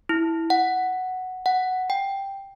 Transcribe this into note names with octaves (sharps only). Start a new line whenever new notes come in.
E4
F#5
F#5
G5